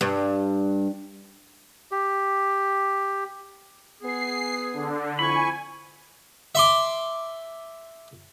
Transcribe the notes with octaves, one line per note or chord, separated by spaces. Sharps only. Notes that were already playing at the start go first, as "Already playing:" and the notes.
G2
G4
B3 G#4 C7
D3
F2 E4 G#5 B5 C#6
E5 C6 D6